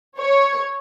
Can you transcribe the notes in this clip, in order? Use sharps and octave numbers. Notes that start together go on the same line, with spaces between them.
C#5